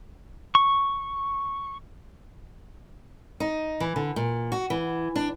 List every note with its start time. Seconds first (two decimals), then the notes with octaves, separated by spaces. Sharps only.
0.55 C#6
3.40 D#4
3.80 E3
3.96 D3
4.16 A#2
4.52 F#4
4.70 E3
5.16 D4